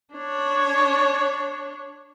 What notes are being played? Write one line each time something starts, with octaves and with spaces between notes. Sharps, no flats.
D4 C#5